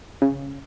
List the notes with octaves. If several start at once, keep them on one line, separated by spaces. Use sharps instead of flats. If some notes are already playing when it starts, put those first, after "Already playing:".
C#3